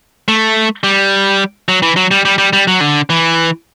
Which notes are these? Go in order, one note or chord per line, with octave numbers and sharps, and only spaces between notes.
A3
G3
F#3
E3
F#3
G3
G3
G3
G3
F#3
D3
E3